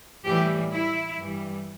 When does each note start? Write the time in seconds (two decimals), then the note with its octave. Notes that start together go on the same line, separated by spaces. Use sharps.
0.24 A2 E3 G3 G4
0.71 E4
1.18 G2 E3 G3